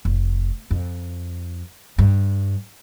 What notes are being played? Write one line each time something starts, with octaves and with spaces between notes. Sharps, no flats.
F1
F2
G2